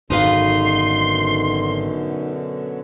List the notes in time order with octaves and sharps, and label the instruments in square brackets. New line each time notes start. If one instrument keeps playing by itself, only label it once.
[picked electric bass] G#1 [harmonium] F#2 B2 D3 [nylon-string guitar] D#4 B4 F5 [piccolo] C6